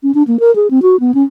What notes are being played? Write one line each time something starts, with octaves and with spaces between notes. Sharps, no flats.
C#4
D4
A#3
A#4
G#4
C4
F#4
B3
C#4